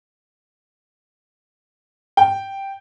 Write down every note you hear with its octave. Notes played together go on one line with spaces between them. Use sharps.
G5